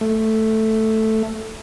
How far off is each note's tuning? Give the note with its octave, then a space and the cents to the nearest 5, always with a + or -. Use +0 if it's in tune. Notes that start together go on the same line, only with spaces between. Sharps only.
A3 +0